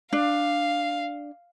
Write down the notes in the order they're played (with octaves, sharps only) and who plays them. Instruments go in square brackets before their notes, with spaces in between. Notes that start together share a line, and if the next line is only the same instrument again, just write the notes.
[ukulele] D4 [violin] F5